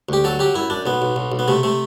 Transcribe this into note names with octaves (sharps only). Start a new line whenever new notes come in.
D2 G4
F#3 A4
F#3 G4
F#2 E4
F#2 D4
B1 B3
B1
B1
B1
B3
C3 A3
C3 A3